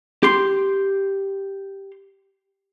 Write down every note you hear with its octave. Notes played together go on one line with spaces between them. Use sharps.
G4 C6